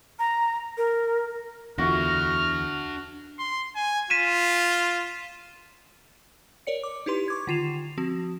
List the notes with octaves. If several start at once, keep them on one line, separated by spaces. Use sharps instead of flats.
A#5
A#4
E2 D3 D4 F#4 E5 F6
C6
G#5
F4 B6 D#7 E7
A#4 C#5 D5 C#7
D6
D#4 E4 G4 B4 C6
C#6 D6 G#6
D3 D#3 F4 C7 E7 F7
F3 C4 F#4